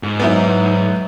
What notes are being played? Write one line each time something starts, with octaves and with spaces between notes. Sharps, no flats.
G#2
F#3 B3 D#4 E4